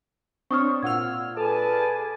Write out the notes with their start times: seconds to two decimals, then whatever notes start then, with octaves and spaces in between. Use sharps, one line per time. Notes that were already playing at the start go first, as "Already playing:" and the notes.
0.51 C4 D4 C#5 C#6 D#6 F6
0.83 A#2 F4 F#5 E6 F6 G#6
1.37 G#4 A4 B4 D5 G#5 A5